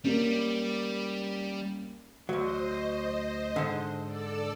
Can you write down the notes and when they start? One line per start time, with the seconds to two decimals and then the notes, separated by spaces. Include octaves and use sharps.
0.04 G3 A#3 C#4
2.29 D2 F#3 C5 D#5
3.56 G#2 D3
4.04 A4 D5 E6